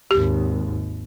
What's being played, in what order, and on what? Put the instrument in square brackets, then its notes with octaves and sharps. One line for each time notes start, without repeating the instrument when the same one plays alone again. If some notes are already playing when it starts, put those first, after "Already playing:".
[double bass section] G#1 D#2 [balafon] G4